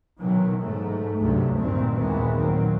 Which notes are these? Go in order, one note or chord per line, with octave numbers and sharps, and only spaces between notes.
B2 D#3 E3 F#3
G#2 A3
D2 G2 C3 F#3 G3 A3
G2 A#2 D#3 E3 G3 C4
D#2 A#2 E3 G#3 B3
A#2 D#3 F#3 C4